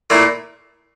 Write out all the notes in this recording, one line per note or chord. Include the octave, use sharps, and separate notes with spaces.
A#2 A3 E4